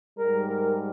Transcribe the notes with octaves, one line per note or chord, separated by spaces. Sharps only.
G#2 G3 A#4
A#4